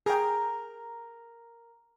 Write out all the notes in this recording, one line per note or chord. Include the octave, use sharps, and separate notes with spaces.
G#4 A#4 G5